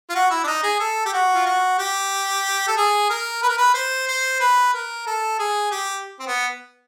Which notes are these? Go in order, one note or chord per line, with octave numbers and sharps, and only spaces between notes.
F4
F#4
E4
D4
D#4
G#4
A4
G4
F#4
F4
F#4
G4
A4
G#4
A#4
B4
A#4
B4
C5
C5
B4
A#4
A4
G#4
G4
C4
B3